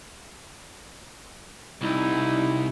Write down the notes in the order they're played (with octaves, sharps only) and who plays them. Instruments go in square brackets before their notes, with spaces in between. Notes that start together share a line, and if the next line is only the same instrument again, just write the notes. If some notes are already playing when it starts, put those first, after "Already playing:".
[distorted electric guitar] C2 [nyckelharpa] D#4 E4